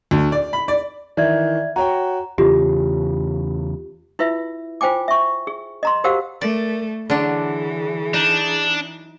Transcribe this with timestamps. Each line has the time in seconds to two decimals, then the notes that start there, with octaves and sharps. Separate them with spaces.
0.11 D2
0.32 D5
0.53 B5
0.68 D5
1.17 D#3 E3 D5 E5 G#6
1.76 F#4 C#5 G5 A#5
2.38 E2 C#3 F4 G4
4.19 E4 F4 B4 E5
4.81 F4 C5 G5 G#5 D6
5.08 E5 C#6
5.47 G#4
5.83 D#5 A#5 C6
6.04 F#4 G4 A#4 C5 F5 F#5
6.41 A3 A#4 D5
7.10 D3 E3 F#3 D4 G#4
8.14 D4 D#4